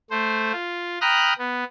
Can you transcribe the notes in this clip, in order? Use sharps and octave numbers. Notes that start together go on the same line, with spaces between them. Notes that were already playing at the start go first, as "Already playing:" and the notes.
A3 C5
F4
G5 A#5 B5 D#6 F6 F#6
B3